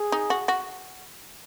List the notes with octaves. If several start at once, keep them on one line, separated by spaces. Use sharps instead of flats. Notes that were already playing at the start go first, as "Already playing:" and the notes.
Already playing: G#4
D#4
F#4
F#4